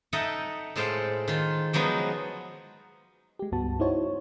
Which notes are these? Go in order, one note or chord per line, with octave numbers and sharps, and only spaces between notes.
D#4 A4 D#5 E5 F#5 G5
A2 G#3 A4 C5 F5 G5
D#3 F4
F3 F#3 G#3 B3 D#4
G#3 G4
C#2 G2 B3 F#4 A5
D#4 E4 F#4 C5 C#5